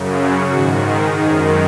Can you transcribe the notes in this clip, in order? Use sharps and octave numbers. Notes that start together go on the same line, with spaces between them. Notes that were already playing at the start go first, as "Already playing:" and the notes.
Already playing: F#2 C#3
F#4
G#2 D#3 F#4
G#4
F#2 D#3 G#4